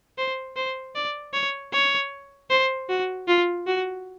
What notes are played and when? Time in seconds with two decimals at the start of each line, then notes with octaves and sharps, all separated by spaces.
0.18 C5
0.56 C5
0.95 D5
1.33 C#5
1.73 C#5
2.50 C5
2.89 F#4
3.28 F4
3.67 F#4